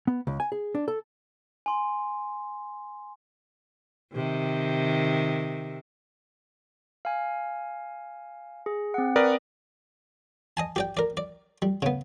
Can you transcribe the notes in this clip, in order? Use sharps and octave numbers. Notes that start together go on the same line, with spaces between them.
B3
C#2
G#5
G#4
D4
A4
G#5 C6
C3 D#3
F5 G#5
G#4
C4 F#5
A#4 B4 D5 D#6
D#5 G#5 A5
G4 D5 G5
A#4 D5
D5
G3
C#3 B3